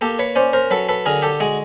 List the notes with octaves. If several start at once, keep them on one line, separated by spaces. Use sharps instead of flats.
A#3 G4 A4
B4 C#5
C#4 C5 D5
A#4 C5
F#3 A4 B4
A4 B4
D3 G#4 A#4
G4 A4
G#3 F#4 G#4